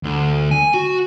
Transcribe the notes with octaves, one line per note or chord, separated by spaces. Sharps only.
D2
G#5
F#4